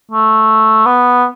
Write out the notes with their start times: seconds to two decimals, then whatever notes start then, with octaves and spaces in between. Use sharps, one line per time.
0.12 A3
0.86 B3